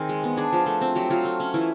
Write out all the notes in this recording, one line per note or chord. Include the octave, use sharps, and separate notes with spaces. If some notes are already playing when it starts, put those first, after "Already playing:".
Already playing: D#3 C4 G#4 A#4
G#3
B3
D4 G#4
F3
A3
C4
F#3 G4
F#3 F4
A3
C#4
E3 E4